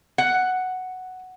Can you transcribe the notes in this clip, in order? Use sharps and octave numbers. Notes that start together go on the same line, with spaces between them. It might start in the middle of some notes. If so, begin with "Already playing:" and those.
F#5